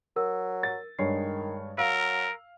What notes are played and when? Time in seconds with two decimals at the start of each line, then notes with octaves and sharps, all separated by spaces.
0.16 F#3 A#4 E6
0.63 A6
0.99 G2 D#3 G#3 C#5 C7
1.78 F#3 A#4 F5 E6